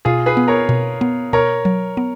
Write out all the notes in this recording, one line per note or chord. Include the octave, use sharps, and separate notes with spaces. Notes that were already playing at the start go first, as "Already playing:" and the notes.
B2 F4 G#4
G#4 B4
B3
A#4 C#5
B2
B3
B2 A#4 C#5
F#3
B3